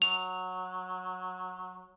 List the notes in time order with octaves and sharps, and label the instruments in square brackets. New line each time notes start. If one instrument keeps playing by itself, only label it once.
[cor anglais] F#3 [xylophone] F7